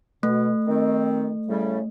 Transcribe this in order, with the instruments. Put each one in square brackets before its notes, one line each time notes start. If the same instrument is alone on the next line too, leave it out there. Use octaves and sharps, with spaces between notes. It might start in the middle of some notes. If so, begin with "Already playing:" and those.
[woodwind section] B2 [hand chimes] A3
[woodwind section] D#3 C4
A2 C#3 G3